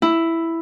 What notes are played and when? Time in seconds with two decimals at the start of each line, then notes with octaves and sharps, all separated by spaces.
0.02 E4